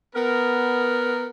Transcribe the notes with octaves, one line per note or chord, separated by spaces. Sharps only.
B3 A#4